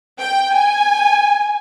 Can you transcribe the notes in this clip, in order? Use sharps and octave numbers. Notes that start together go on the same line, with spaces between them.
G5
G#5